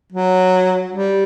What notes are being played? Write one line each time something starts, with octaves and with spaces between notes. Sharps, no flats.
F#3
G3